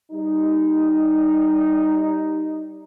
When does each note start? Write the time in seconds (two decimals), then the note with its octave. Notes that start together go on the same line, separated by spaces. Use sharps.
0.12 G3 D#4